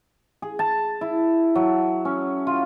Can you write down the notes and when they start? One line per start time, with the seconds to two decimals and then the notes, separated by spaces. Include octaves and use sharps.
0.42 G#4
0.59 A5
1.01 E4
1.55 F#3
2.05 C#4
2.47 F4